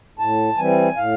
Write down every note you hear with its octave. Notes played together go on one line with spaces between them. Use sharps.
A2 A5
E3 G3 C4 G#5
A2 F5